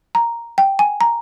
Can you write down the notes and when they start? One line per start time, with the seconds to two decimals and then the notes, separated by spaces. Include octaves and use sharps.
0.15 A#5
0.58 G5
0.79 G#5
1.01 A#5